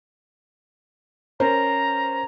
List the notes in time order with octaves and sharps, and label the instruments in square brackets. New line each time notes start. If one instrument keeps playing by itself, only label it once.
[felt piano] C#4 A#4 C5 [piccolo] A#5